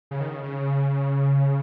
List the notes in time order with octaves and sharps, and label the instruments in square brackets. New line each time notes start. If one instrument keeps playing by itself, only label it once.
[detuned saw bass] C#3
D#3
C#3
C#3